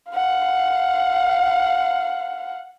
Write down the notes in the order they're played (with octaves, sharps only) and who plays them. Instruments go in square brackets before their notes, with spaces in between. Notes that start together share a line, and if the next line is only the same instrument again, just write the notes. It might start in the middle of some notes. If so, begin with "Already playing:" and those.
[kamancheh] F5 F#5